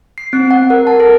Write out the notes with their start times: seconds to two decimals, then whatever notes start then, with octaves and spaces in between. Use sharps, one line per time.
0.18 C7
0.33 C4
0.51 F#5
0.70 A#4
0.87 A5
1.00 A4